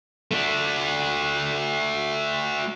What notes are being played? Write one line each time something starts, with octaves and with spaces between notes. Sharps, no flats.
A3 D4